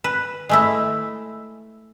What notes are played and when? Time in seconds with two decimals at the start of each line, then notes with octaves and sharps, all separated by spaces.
0.04 B4
0.49 G#3 A3 E4